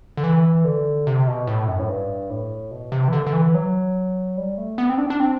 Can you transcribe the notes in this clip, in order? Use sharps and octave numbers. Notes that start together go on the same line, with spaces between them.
D3
E3
D3
C3
B2
A2
F#2
A2
G2
A2
B2
C3
E3
D3
D3
E3
F#3
G3
A3
B3
C4
D4
D4
C4